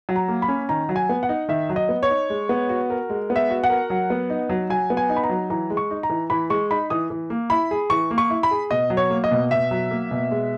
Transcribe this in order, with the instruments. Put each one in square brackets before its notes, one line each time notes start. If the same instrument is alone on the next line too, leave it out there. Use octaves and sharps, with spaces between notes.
[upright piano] F#3
[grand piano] A#5
[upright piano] A#3
[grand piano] B5
[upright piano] C#4
[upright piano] D#3 [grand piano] A#5
[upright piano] F#3
[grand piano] G#5
[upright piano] B3
[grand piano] F#5
[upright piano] D#4
[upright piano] D#3 [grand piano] E5
[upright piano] F#3
[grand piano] D#5
[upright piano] B3
[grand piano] C#5
[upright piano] D#4
G#3
B3
F#4
A#4
G#3
B3
[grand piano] E5
[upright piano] F#4
[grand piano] F#5
[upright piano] A#4
F#3
B3
D#4
F#3
[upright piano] F#3 [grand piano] G#5
[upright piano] B3
[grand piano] G#5
[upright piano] D#4
[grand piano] B5
A#5
[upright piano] F#3
[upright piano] E3 [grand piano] A#5
[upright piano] G#3
[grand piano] C#6
[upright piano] D#4
[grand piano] A#5
[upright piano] E3
[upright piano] E3 [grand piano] B5
[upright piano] G#3 [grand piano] C#6
[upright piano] D#4 [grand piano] B5
[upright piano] E3 [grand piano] D#6
[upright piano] E3
A#3
[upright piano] E4 [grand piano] B5
[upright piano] G#4
[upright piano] E3 [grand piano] C#6
[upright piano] A#3
[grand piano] C#6
[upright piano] E4
[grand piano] B5
[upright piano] G#4
[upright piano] B2 [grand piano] D#5
[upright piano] F#3
[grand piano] C#5
[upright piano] A#3
[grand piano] D#5
[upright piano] B2
[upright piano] B2 [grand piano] E5
[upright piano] F#3
A#3
B2
G#3